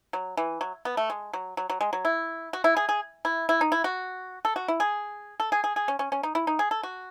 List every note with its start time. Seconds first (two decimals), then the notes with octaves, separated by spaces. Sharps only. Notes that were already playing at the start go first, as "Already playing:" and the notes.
0.13 F#3
0.37 E3
0.61 F#3
0.85 B3
0.97 A3
1.10 G#3
1.33 F#3
1.57 F#3
1.70 F#3
1.81 G#3
1.93 F#3
2.05 E4
2.53 F#4
2.64 E4
2.77 G#4
2.89 G#4
3.25 E4
3.49 E4
3.61 D#4
3.72 E4
3.84 F#4
4.45 A4
4.56 F#4
4.68 E4
4.80 G#4
5.40 A4
5.52 G#4
5.64 G#4
5.76 G#4
5.88 C#4
5.99 C#4
6.12 C#4
6.23 D#4
6.35 E4
6.47 D#4
6.59 G#4
6.71 A4
6.83 F#4